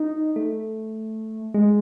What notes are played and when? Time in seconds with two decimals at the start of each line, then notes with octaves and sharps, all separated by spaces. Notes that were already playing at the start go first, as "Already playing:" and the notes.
Already playing: D#4
0.36 A3
1.54 G#3